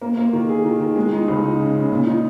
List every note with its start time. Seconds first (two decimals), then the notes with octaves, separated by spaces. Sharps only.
0.02 A#3
0.17 A#3
0.33 D#3
0.49 G#4
0.65 D#3
0.80 D#3
0.96 G#3
1.12 D#4
1.28 C#2
1.44 D#4
1.59 C#3
1.75 C#3
1.91 A#2
2.07 D#4